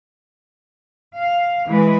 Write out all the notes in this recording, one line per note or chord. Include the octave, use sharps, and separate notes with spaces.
F5
E3 G#3 B4